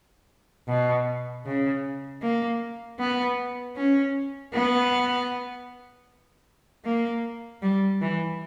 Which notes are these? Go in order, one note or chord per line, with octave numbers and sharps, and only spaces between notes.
B2
C#3
A#3
B3
C#4
B3
A#3
G3
E3